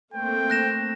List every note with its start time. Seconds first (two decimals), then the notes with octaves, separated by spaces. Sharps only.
0.14 A3 A#3 C4 G5
0.50 F#6 A#6 E7